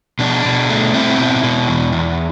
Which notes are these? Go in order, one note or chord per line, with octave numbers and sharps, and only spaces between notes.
B2 D4
B2
A3
C4 E4
B2
B2
E2
E2